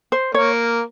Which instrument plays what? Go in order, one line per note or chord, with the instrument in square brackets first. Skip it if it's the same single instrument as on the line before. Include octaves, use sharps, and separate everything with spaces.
[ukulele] C5
[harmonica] A#3 [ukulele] C#5